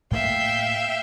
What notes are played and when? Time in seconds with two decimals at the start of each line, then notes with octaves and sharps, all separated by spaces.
0.11 A2 A3 A#3 E5 F5 G5